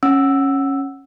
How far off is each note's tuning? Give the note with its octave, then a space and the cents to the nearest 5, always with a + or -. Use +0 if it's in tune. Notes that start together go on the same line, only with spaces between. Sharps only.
C#4 -15 F#5 +0 E6 +0